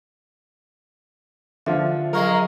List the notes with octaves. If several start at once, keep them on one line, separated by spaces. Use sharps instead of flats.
D3 F3 E5
F#3 G#3 A#3 A#4 C#6